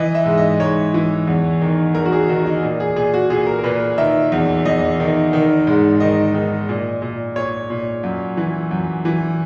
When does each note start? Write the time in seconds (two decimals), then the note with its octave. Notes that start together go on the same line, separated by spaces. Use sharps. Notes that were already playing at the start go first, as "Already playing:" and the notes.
Already playing: E3 D#5
0.15 E5
0.26 G#2
0.38 D#5
0.60 G#2 C#5
0.94 E3
1.27 E2
1.61 D#3
1.95 E2 A#4
2.05 F#4
2.12 G#4
2.28 D#3 F#4
2.46 D#4
2.63 A#2
2.80 G#4
2.96 A#2 G#4
3.14 F#4
3.30 A#2 G#4
3.47 A#4
3.59 A#4
3.64 A#2 B4
3.98 D#3 E5
4.32 E2
4.65 E2 D#5
5.00 D#3
5.33 D#3
5.67 G#2
6.00 D#3 D#5
6.34 D#3
6.69 A#2
7.02 A#2
7.36 A#2 C#5
7.70 A#2
8.03 F#2
8.37 E3
8.71 F#2
9.05 E3